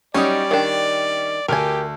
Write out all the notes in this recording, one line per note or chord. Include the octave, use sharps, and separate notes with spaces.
F#3 G3 C#4 D#4 D5
D#3 D4
D2 G4 A#4 G#5